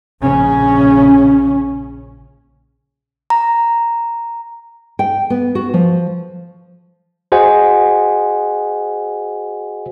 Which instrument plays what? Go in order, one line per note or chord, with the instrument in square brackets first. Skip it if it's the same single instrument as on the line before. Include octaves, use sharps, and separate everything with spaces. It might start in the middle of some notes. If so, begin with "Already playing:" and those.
[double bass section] A#1 C#3 C#4
[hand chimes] A#5
[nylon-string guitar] G5
B3
F#4
F3
[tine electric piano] F#4 G#4 C5 D#5 F#5 G#5